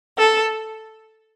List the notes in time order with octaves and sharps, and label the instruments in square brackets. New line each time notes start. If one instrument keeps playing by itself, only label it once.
[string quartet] A4